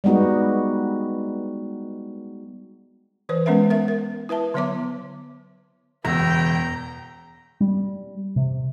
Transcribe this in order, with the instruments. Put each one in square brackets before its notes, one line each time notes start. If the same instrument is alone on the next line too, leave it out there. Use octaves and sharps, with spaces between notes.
[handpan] G3 G#3 B3 D#4 F#4
[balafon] E3 B4 C5
G#3 B3 C#4 A#4 B4 E5
A#4 E5
A#4
E4 B4 E5 A5
D3 F#3 B3 C#5 E5 D6
[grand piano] E1 E6 [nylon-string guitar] E2 C#3 [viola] B3 G5 [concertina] A#5
[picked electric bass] G3
C3